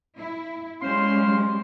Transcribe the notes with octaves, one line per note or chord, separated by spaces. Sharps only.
E4
G3 G#3 C#4 C5 F5 C6